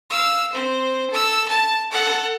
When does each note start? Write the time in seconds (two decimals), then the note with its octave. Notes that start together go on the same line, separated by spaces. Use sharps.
0.10 F5 E6
0.52 C4 C5
1.10 A4 E6
1.48 A5
1.91 A4 F#5